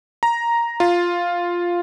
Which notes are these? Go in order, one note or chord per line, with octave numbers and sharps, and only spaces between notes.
A#5
F4